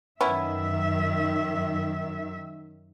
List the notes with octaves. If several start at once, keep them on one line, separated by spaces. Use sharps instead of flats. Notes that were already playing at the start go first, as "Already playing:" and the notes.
F#2 D#3 B3 C#4 E4 E5